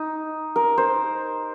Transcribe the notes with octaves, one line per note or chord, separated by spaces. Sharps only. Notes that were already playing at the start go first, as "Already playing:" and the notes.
Already playing: D#4
A#4
C5